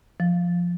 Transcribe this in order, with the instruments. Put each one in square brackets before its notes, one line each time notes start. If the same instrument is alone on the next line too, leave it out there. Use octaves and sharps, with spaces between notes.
[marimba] F3